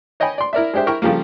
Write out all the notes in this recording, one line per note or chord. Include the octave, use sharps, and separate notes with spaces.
C#5 D#5 G5 G#5 B5
D5 C6
E4 A#4 D5 E5
G#3 D4 G4 C5 E5
E4 A#4 E5 G5 C#6
C#3 F3 G3 A3 A#3